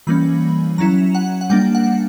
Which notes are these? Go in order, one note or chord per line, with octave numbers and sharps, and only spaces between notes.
E3 G3 A#3 C#4 B5
F#3 C#4 E4 A#5
F#5
F#5
G3 A#3 D4 G5
F#5